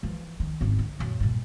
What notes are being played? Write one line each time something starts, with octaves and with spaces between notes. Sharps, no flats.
E3 F3
D#3
G#1 C#4
D3
F#2 A#2
G2 A#2